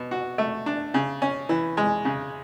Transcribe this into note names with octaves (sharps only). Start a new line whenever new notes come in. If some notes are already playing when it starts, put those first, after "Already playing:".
Already playing: B2
F#4
A3
D4
C#3
C#4
E3
G#3
C#3